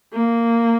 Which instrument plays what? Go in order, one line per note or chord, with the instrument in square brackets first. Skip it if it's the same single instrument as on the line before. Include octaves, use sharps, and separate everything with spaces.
[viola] A#3